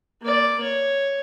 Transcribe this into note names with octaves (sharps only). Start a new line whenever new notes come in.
A#3 D5
C#5